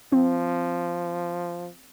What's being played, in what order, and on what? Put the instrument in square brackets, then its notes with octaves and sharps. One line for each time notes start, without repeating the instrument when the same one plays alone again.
[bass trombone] F3 [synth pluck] C4